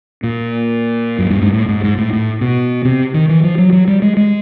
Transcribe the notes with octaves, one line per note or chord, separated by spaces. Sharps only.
A#2
F#2
G2
G#2
A2
G#2
G#2
A2
A2
B2
C3
D#3
E3
F3
F#3
F#3
G3
G#3
G#3